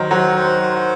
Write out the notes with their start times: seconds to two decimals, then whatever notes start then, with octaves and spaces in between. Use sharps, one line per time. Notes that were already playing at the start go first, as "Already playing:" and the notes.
Already playing: D#3 F#3 C5
0.11 F#3 F#5
0.36 C5
0.62 C5